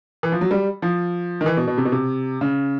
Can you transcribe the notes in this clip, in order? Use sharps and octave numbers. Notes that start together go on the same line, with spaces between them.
E3
F3
F#3
G3
F3
D#3
E3
B2
B2
C3
B2
C3
C#3